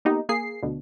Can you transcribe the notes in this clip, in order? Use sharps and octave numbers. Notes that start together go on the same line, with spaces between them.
A#3 B3 D#4 G4
A#3 G#4 C7
D2 B2 D3